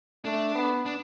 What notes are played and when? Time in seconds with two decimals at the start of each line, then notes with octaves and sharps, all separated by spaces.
0.25 A3 D4
0.55 B3
0.86 D4